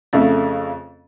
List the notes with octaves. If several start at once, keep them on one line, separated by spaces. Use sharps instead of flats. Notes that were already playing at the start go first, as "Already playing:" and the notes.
F2 C#3 A3